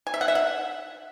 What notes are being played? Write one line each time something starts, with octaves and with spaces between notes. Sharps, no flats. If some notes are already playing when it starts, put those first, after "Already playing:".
G#5
E5
F#5
E5
F#5